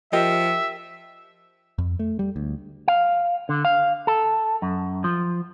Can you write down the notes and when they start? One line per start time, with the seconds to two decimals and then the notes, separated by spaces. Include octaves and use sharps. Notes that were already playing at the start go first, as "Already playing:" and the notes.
0.13 F3 G4 A#4 D#5 E5
1.78 F2
1.99 A3
2.19 G3
2.36 D2
2.88 F5
3.49 D3
3.65 F5
4.07 A4
4.62 F#2
5.04 F3